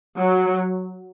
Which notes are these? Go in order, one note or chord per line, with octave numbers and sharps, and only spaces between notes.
F#3